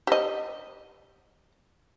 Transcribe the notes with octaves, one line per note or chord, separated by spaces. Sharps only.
G4 D#5